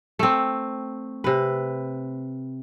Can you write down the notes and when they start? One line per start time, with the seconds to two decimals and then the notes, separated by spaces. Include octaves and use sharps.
0.19 A3 C4
1.24 C3 B4